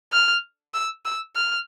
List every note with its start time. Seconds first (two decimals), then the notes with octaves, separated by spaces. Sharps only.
0.13 F6
0.74 E6
1.05 E6
1.36 F6